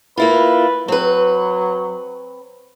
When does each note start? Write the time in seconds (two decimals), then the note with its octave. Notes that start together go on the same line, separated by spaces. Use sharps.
0.17 A#3 E4 F4 B4
0.88 F#3 C4 B4